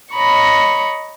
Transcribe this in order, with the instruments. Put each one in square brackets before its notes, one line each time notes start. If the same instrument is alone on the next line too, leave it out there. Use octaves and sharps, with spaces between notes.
[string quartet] C#5 D#5 A#5 B5 C#6